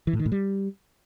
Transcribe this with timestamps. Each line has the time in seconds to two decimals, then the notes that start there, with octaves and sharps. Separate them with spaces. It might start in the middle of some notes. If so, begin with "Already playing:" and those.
0.07 E3
0.13 A2
0.19 D#3
0.26 A2
0.32 G3